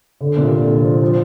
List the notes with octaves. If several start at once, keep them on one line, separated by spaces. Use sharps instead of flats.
D3
A#2
C3
D3
F3
F3